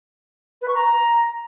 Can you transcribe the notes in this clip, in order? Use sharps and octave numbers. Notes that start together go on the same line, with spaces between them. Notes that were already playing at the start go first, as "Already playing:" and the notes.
B4
C#6
A#5